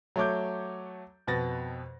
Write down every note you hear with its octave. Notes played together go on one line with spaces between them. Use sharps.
F#3 A3 C#5 D6 G6
F2 B2 B4 A6 A#6